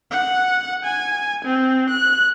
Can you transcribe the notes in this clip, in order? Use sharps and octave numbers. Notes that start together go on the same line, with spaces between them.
F#5
G#5
C4
F#6